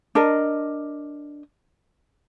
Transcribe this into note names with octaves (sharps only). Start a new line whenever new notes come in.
D4 A#4 D#5